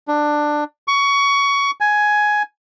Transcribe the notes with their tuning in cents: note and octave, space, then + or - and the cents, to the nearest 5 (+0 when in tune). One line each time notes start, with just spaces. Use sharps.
D4 +15
C#6 +20
G#5 +10